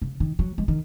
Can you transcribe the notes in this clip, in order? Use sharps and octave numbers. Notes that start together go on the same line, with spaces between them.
C#3
D#3
F#3
G#3
D#3